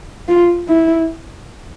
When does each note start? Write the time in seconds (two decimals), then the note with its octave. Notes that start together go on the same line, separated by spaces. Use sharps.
0.28 F4
0.69 E4